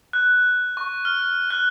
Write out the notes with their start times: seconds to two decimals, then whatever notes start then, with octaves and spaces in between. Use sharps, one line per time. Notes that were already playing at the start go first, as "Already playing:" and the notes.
0.13 F#6
0.77 C#6
1.05 F6
1.51 F#6